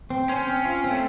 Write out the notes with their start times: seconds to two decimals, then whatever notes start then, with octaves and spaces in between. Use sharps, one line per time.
0.10 C4
0.29 C#4 C5
0.47 C4
0.65 F4
0.84 C4
0.90 A3